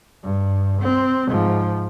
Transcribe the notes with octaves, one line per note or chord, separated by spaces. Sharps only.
G2
C4
G#2 F3